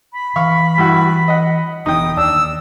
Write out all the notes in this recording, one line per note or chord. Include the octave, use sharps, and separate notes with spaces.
B5
E3 F5 C#6 F6
G2 E4 F#4
D#5 F#5
F1 E3 B3 D#4 G5 D#6
D#2 D4 E6